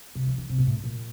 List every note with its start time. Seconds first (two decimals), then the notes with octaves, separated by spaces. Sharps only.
0.15 C3
0.27 E3
0.38 D3
0.49 C3
0.58 A#2
0.67 A2
0.84 A#2